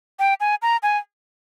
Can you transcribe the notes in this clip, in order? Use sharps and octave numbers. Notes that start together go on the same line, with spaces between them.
G5
G#5
A#5
G#5